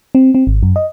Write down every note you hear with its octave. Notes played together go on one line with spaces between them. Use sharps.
C4
C4
G#1
F#2
D#5